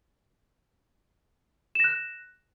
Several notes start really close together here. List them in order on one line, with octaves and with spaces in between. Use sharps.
E7 A#6 F#6